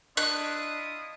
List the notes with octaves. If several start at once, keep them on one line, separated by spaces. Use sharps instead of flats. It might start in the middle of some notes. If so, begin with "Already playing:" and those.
D4 E4 F4 D#5 D#6 F#6